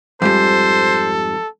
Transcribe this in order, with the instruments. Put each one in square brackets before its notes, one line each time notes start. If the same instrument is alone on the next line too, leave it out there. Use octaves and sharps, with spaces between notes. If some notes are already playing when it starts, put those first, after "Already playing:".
[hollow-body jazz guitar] F2 G#2 G3 [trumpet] A4 [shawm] C5